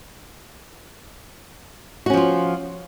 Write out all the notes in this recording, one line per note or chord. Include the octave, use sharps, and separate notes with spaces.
F3 C#4 F4 F#4